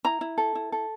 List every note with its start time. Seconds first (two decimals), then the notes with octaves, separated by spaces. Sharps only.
0.05 E4 A#5
0.21 E4
0.38 A4
0.55 E4
0.72 A4